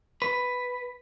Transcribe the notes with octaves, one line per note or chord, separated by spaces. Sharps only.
B4